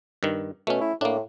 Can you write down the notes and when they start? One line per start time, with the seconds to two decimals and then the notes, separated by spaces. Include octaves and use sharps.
0.23 G2 D#3
0.67 B2 A3 C#4
0.81 E4
1.01 A2 A#3 D4